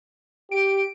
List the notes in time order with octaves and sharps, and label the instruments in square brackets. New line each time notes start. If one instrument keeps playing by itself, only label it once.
[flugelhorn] G4 [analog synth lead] D7